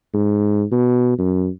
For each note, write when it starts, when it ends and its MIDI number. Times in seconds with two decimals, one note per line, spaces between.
0.14 0.63 44
0.72 1.14 47
1.19 1.48 42